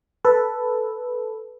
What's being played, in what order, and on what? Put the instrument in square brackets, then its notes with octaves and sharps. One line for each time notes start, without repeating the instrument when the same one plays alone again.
[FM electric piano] A4 B4